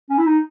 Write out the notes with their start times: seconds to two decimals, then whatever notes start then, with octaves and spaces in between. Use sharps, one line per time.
0.10 C#4
0.18 E4
0.26 D#4